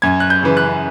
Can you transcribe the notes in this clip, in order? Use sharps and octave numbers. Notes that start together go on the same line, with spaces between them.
F#2 G#6
F#6
G6
C#3 E3
F#6